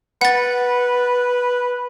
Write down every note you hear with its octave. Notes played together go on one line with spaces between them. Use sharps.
B4 F#5 A6